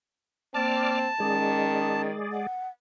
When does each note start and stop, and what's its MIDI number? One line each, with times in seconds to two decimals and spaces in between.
0.54 1.05 58
0.54 1.08 60
0.54 0.99 74
0.54 2.02 81
0.54 0.99 86
0.54 0.99 89
1.20 2.16 51
1.20 2.47 56
1.20 2.03 61
1.20 2.47 68
1.20 2.47 74
2.32 2.68 78